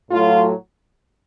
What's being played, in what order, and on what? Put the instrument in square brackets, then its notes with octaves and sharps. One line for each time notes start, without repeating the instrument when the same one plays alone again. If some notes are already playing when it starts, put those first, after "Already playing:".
[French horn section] A2 F#3 F4